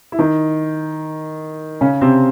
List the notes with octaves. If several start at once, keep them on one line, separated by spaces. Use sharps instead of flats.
E4
D#3 D#4
C#3 C#4
C3 C4